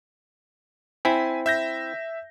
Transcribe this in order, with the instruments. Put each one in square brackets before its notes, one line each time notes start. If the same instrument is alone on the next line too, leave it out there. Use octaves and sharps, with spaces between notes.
[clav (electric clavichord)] C4 E4 [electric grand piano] G#5 B6
[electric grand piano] E5 G6 A#6